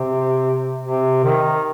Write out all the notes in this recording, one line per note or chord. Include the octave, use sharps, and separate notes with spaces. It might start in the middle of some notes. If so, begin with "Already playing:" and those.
Already playing: C3
C3
D#3